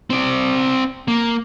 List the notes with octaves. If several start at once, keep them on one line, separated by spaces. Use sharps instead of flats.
C4 D5
A#3